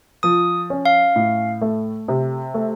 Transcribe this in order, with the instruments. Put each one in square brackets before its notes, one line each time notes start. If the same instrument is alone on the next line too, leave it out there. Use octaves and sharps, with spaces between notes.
[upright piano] F3 [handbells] D#6
[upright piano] C#4
[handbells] F5
[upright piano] A2
A3
C3
A3